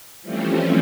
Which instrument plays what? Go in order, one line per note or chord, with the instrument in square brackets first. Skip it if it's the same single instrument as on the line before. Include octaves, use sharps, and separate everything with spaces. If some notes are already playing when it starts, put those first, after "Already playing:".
[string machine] E3 F3 G3 A3 C4 C#4